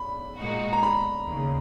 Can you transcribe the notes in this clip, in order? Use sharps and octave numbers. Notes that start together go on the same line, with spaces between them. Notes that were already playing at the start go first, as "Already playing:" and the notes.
Already playing: B5
A#2 G#3 D#4 F#4
A#5
B5
D#2 C#3